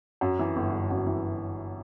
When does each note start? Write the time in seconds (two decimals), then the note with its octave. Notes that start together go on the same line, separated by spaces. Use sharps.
0.21 F#2
0.39 E3
0.56 G1
0.72 G1
0.90 F#2
1.07 E3